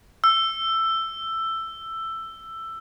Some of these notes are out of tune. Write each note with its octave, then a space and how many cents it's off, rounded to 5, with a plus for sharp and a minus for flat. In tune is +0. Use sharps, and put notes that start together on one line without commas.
E6 +10